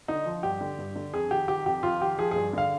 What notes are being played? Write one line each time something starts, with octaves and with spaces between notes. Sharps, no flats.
D3 D#4
F3
G2 G4
D3
G2
D3
F2 G#4
D#3 G4
D#3 G4
F2 G4
F2 F4
D#3 G4
F3 G#4
G2 G#4
D3 F5